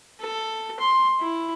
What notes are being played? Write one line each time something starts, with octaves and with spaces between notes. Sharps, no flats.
A4
C6
E4